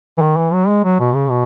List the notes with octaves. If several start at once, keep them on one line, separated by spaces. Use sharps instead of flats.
E3
D#3
E3
F#3
G#3
F#3
B2
C#3
B2